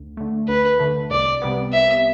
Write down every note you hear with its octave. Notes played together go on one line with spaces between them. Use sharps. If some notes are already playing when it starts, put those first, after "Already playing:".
Already playing: D2
D3 A3
D2 B4
D3 A3
C2 D5
C3 G3 B3
C2 E5